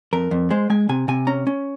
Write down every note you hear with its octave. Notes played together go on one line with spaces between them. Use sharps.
F2 A#4
F2
G#3 C5
G#3 G#5
C3 G#5
C3 G#5
C#4 A#5
C#4